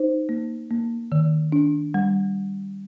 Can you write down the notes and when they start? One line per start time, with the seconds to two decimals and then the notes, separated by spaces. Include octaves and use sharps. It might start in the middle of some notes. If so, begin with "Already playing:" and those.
Already playing: D#4 C5
0.29 A#3
0.71 A#3
1.12 D#3
1.52 D4
1.94 G3